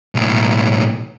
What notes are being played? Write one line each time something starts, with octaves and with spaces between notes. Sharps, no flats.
B1 A2